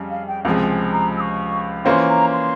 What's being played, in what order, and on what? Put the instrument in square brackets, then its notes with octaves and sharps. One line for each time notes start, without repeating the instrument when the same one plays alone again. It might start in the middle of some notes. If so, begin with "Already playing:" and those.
Already playing: [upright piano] F2 C#3 G3
[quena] F5
G5
[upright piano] C#2 C3 F3 G#3 [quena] G#5
[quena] G#5
A#5
E6
C#6
[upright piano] E3 A#3 C#4 F4 C5 [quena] C6
[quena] A#5
C6